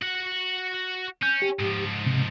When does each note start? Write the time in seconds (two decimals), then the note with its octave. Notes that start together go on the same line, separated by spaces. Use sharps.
0.02 F#4 F#5
1.23 C#4 G6
1.42 G4
1.60 G#2 F3
2.06 C3